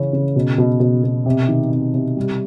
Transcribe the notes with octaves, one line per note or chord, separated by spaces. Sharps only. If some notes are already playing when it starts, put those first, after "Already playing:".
Already playing: C#3 E3 C#4
C#3
B2
B2
B2
B2
C3
D#3
C3
C3
G3